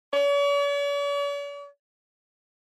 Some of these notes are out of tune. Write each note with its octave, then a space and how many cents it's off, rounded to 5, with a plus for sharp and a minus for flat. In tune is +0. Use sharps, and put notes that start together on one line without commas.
C#5 +45